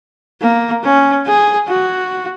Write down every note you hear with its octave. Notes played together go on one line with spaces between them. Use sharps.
A#3
C#4
G#4
F#4